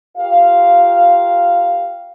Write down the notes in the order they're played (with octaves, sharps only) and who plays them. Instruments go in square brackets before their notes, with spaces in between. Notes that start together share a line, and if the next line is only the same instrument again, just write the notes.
[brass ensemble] F4 G4 A#4 F5